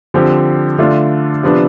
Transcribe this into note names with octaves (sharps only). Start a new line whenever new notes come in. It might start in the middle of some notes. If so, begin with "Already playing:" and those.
D3 F3 C4 G4
D3 A3 D4 F4
C3 F3 B3 D4